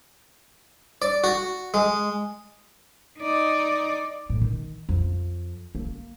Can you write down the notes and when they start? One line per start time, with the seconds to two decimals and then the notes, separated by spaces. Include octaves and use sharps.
1.02 D5
1.24 F#4
1.74 G#3
3.18 D#4 D5
4.30 A2
4.41 D#3
4.89 F2
5.75 A#3